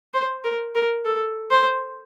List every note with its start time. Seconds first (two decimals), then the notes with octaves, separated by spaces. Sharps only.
0.14 C5
0.44 A#4
0.75 A#4
1.05 A4
1.51 C5